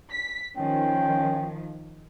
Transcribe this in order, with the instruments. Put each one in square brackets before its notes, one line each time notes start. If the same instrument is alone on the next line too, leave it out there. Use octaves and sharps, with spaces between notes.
[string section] B6
[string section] D#3 F3 [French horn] C#4 [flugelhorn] G5